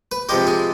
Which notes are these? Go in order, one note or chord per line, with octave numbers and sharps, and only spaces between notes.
B4
C3 F3 G#3 G4
G#4